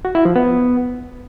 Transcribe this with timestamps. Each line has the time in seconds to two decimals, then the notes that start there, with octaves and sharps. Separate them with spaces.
0.05 F#4
0.15 E4
0.25 F3
0.36 B3